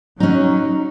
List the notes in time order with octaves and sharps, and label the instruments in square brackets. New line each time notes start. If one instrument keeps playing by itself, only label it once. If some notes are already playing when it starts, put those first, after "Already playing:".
[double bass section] F#3 [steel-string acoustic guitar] C#4 D#4